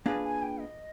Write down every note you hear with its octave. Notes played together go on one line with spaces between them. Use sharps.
A#3 D4 F4 G#4 B4 G#5
G#5
G5
D#5